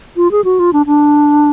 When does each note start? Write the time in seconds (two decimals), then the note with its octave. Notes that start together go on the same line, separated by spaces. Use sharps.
0.17 F4
0.31 G#4
0.44 F#4
0.59 F4
0.73 D4
0.86 D4